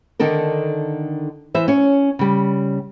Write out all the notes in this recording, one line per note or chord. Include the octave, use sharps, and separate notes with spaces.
D3 D#3 D4 A4 A#4
E3 C5 E5
C#4 C#5
C#3 G3